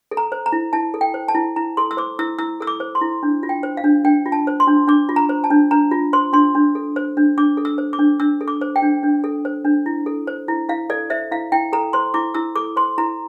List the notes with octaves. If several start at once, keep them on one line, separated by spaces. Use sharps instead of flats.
A4
A#5
C5
A#5
E4
E4 A5
A4
G5
C5
A5
E4
E4 A#5
A4 C6
E6
C5 D6
E4 E6
E4 E6
A4 E6
D6
C5
C6
E4
D4
F4
G5
C5
F5
D4
D4 G5
F4
A5
C5
C6
D4
D4 D6
F4
A#5
C5
A5
D4
D4 A#5
F4
C5 C6
D4 C6
D4
A4
C5
D4
D4 D6
A4
E6
C5
D6
D4
D4 E6
A4
D6
C5
G5
D4
D4
A4
C5
D4
E4
A4
C5
E4
E4 F5
A4 D5
C5 E5
E4 F5
E4 G5
A4 A#5
C5 C6
E4 D6
E4 E6
A4 D6
C5 C6
E4 A#5